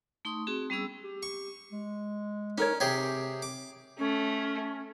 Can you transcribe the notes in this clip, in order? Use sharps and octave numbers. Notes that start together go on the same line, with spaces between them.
A3 D#4 C6 C#6 D#6
C4 F#4 G#4
G3 B3 C#4 G#4 E6
G4
C#6
G#3
C#4 D#4 A#4 C#5
C3 C4 G4 G#4 C#5
C4 D6
A3 C#4